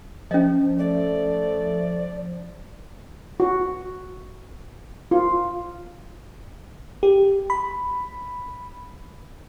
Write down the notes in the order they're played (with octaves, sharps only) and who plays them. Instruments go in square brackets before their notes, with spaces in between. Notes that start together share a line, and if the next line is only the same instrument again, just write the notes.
[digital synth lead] F3 [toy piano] C#4 D#5
[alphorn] A3 [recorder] D5
[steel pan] F#4
F4
[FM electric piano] G4
B5